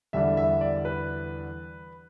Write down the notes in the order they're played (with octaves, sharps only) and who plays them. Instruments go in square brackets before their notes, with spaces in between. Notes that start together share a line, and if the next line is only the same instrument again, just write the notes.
[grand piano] E2 D3 G3 D4 E5
E5
D5
B4